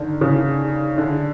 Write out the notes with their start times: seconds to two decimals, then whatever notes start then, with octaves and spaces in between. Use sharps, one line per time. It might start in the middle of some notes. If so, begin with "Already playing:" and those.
Already playing: D3 D#3
0.21 C#3
0.98 D3